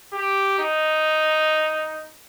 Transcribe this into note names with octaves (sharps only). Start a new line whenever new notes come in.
G4
D#4